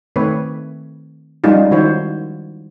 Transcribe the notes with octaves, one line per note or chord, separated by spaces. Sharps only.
D#3 A3 C4 B4 C#5
F3 G3 G#3 C#4 D#4 F4
D#3 F3 E4 F#4 C5 C#5